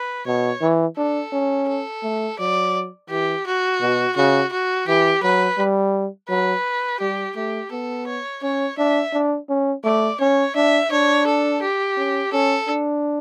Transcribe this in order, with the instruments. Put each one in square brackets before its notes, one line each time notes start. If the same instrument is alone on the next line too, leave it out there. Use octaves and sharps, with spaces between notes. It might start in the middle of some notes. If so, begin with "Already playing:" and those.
Already playing: [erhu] B4
[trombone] B2 [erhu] C#5
[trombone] E3
[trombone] D4 [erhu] A4
[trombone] C#4
[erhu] A4
[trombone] A3
[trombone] F#3 [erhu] D5
[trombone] E3 [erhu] G4
[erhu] F#4
[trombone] B2
[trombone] C#3 [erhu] F#4
[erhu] F#4
[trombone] E3 [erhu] G4
[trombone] F#3 [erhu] B4
[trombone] G3
[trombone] F#3 [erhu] B4
[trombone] G3 [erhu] G4
[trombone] A3 [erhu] G4
[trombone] B3 [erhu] A4
[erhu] C#5
[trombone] C#4 [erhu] C#5
[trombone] D4 [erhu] E5
[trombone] D4
C#4
[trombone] A3 [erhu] D5
[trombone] C#4 [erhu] C#5
[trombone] D4 [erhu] E5
[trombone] D4 [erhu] C#5
[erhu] A4
G4
[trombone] C#4
[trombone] C#4 [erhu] A4
[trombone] D4